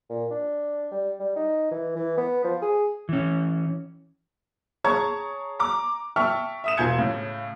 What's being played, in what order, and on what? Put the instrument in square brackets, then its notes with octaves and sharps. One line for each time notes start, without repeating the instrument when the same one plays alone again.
[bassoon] A#2
D4
G3
G3
D#4
E3
E3
B3
F3
G#4
[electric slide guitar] E3 C#4
[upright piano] G#4 C#5 A5 A#5 C#6 G#6
A#5 D6
E5 G5 A5 C#6 E6 F6
E5 D#6 E7
E1 F4 G#5 G6 G#6 C#7
A2 C#3